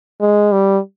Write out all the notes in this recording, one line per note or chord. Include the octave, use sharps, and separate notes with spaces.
G#3
G3